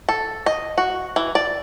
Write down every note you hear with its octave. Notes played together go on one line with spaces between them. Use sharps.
A4
D#5
F#4
E3
D5